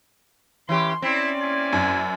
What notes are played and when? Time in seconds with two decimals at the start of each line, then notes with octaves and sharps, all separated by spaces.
0.69 E3 C#4 G4 C6
1.02 C4 C#4 E4 D5
1.41 A#3 E4 G#5
1.73 F#2